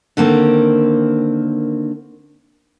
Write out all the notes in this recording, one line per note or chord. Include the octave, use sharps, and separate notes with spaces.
D3 D#3 A#3 C4